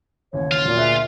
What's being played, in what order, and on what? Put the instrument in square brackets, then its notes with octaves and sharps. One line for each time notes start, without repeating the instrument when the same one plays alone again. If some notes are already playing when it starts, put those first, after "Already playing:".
[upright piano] A1 D#2 C#3 [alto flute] C#5
[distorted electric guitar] F4
[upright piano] E1 F#3 [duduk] A#2
[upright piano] D2 G#4 F#6 [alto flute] E5